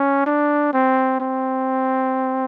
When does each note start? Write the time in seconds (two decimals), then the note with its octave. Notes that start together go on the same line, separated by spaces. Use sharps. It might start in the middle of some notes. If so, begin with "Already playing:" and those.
Already playing: C#4
0.26 D4
0.73 C4
1.20 C4